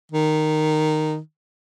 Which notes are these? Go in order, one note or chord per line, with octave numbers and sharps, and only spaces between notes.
D#3